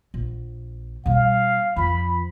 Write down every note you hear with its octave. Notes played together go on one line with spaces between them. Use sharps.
A#1
B2 G3 F5
F2 F3 B5